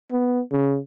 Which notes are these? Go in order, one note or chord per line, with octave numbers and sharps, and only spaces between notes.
B3
C#3